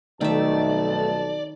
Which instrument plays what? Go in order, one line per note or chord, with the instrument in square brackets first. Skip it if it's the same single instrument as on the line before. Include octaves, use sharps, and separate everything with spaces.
[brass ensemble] B1 F2 A5 [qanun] D#3 E5 [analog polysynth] A3 [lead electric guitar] D5